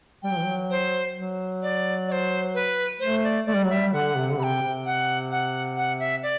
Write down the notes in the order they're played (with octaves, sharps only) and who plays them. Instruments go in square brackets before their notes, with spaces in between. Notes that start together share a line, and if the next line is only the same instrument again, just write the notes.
[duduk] G3 [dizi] G5
[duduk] F#3
E3
F#3
[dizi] C5
[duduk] F#3
[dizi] D5
D5
C5
B4
[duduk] A3 [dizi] C5
[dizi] D5
[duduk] A3 [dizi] D5
[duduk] G3
F#3
[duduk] G3 [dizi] E5
[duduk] D3 [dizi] F#5
[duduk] C3
D3
[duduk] C3 [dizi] B5
[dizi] G5
[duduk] C3
[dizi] F#5
F#5
F#5
E5
D5